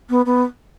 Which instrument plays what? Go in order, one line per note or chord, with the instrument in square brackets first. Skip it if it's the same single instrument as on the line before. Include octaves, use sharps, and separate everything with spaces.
[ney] B3
B3